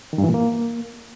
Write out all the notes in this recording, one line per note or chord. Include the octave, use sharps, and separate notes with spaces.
D#3
G2
E3
A#2
A#3